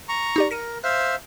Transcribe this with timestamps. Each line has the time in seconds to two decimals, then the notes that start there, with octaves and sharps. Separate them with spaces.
0.09 A#5 C#6
0.36 D#4 G4 D5
0.51 A#4 A#6 C#7 D#7
0.84 C5 E5 F5 F6